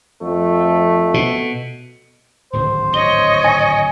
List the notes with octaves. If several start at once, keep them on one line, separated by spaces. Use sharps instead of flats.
F2 A3
B2
D1 G#1 D2 C5
C#5 D#5 G7
G#5